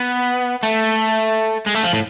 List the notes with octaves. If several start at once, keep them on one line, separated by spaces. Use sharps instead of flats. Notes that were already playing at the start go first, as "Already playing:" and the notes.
Already playing: B3
A3
G#3
A3
F3
A2